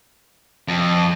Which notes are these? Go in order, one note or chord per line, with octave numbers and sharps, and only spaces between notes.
F2